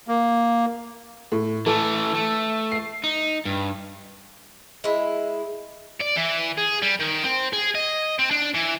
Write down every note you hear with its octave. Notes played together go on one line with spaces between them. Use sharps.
A#3
A2
E3 A3 A4
A3
C7
D#4
G2
G#3 E4
D5
E3
G#4
G3
D#3
C4
G#4
D#5
C4
D4
E3